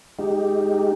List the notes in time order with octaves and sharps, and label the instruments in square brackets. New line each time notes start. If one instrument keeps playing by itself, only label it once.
[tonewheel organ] G#3 D#4 G4